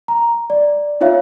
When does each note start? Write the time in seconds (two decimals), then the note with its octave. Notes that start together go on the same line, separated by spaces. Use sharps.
0.08 A#5
0.50 D5
1.01 D#4 F4 C#5 E5 F5